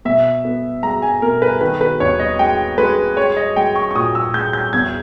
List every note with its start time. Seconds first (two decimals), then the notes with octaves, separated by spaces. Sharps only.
0.05 B2 E5
0.45 B3
0.83 G#3 A#5
1.02 G#5
1.22 B2 A#4
1.42 B4
1.61 D#3 B4
1.81 B4
2.00 D#2 C#5
2.19 D#5
2.39 G#3 G5
2.78 G#3 B4
3.17 G#3 C#5
3.36 D#5
3.56 G#3 G5
3.75 C#6
3.91 C#6
3.95 A#2 D#6
4.15 E6
4.34 G#3 G6
4.53 G6
4.73 E2 G#6